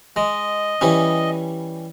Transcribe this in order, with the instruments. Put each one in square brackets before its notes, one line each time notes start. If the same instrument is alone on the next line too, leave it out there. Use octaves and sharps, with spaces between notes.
[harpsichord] G#3 [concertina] D#5
[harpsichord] E3 G3 C#4